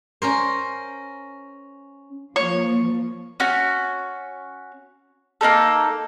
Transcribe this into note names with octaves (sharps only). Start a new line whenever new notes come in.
C#4 A#4 C5
F3 A#3 C#5
C#4 F#4
A#3 C#4 D#4 A4